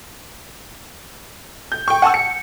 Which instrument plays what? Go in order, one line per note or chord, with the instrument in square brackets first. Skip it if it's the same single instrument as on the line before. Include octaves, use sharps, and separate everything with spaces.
[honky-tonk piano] G6
G5 C#6
F#5 G#5 A5 C#6 E6
C#7